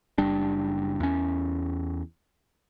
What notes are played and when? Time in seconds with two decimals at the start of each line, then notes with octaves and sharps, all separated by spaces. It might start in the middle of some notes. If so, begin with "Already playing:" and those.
0.18 F#1 G3 D4
1.00 E2 C#4